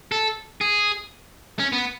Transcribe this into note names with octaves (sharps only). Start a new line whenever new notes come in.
A4
G#4
C#4
B3